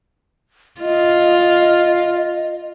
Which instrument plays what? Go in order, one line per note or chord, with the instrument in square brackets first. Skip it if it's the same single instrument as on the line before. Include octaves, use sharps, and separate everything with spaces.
[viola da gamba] F4 [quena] D#5